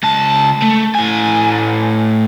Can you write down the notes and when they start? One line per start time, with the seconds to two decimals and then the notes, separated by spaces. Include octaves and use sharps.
0.03 C#2 A5
0.62 A3
0.95 A2 G#5